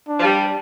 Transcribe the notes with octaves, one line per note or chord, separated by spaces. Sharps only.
D4
F3
G3